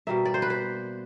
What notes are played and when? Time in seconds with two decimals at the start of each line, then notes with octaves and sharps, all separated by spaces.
0.07 B2 G3 A#3 E5
0.25 D5
0.34 C5
0.42 B4
0.50 C5